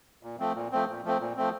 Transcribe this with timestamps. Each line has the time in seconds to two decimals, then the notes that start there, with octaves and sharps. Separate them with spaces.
0.23 A#2
0.39 F3 A3 C4
0.55 A#2
0.72 F3 A3 C4
0.88 A#2
1.05 F3 A3 C4
1.20 A#2
1.36 F3 A3 C4